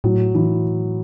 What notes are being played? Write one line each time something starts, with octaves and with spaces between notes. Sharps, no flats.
A2 F#3
E3